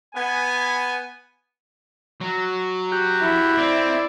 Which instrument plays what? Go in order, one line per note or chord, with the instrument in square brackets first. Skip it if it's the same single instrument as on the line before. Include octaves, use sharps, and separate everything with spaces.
[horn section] B3 G#5
[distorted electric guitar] F#3
[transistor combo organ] F#4 G4
[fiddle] E4
[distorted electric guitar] C4 [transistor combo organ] D5